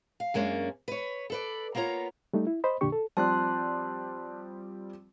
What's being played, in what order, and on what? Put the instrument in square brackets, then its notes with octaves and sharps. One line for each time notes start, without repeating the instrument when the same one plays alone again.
[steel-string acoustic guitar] F5
F#2 G#3 A#3 C#4 D4
B4 C#5
A4 B4 D5
A#3 B3 F4 C#5 A#5
[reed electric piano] G3 A3 D#4
E4
C5 D#5 B5
F2 A#2 D3 D4 G4 C#6
A4
[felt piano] F3 G3 C4 [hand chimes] A5 C6 F#6